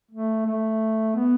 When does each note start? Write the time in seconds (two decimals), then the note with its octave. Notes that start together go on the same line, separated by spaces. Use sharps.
0.11 A3
0.46 A3
1.15 B3